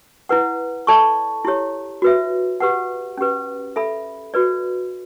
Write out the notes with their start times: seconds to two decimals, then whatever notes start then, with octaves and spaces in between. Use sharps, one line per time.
0.29 E4 B4 F#5
0.87 A4 D5 A5 C#6
1.45 E4 G4 C#5
2.02 F#4 B4 E5
2.60 G4 B4 F#5
3.18 C#4 G4 B4
3.76 A4 E5 B5
4.34 F#4 B4 D5